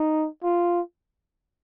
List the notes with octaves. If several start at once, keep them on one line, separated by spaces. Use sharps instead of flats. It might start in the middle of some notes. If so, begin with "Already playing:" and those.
Already playing: D#4
F4